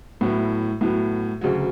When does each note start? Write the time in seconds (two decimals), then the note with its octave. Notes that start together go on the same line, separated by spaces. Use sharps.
0.21 A2 F#3 B3 E4
0.81 A2 F#3 B3
1.41 D2 C#3 F#3